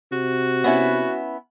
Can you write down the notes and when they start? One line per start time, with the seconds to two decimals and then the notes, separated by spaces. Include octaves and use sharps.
0.12 C3 F#4
0.64 B3 C#4 E4